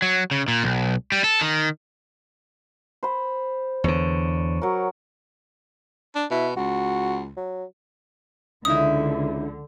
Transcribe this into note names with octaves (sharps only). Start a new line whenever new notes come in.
F#3
C#3
A#2
B1
G3
A4
D#3
C5 B5
E2 D3 C#5
F#3 A#4
D4
B2 E4
C#2 F#4
F#3
C#2 D3 C#4 D#4 E4 D#6